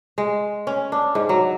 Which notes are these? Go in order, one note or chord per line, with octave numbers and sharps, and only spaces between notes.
G#3
C#4
D4
G#2
F#3